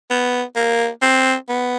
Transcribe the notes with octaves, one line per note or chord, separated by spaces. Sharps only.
B3
A#3
C4
B3